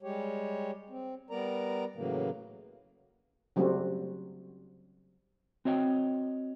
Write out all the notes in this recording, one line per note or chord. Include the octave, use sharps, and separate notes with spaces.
G3 G#3 G4 C#5
C4
G3 B3 A#4 D5 A#5
A2 C#3 E3 F#3 A#3
C#3 F#3 G3 A3 C4 F#4
C4 F#4 C#5 D#5 F5 G5